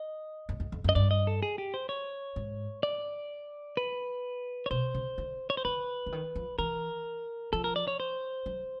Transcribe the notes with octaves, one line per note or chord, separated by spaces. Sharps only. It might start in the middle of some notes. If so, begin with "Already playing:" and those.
Already playing: D#5
F#2
F2
F2
F#2
D#5
G2 D5
D#5
A4
G#4
G4
C5
C#5
G#2
D5
B4
C#5
B2 C5
C#3
D3
C#5
C5
D3 B4
D3
D#3
F3
E3 A#4
F3 A4
A#4
D5
C#5
C5
F#3